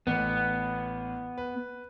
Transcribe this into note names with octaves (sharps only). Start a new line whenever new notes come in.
A1 B3
B4